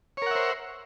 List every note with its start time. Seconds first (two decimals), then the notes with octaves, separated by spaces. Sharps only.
0.17 C#5
0.22 A#4
0.26 F#5
0.31 E5
0.35 C5